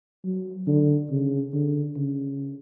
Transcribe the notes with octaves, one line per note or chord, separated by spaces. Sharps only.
F#3
D3
C#3
D3
C#3